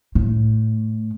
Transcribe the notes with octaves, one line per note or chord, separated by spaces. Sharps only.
A2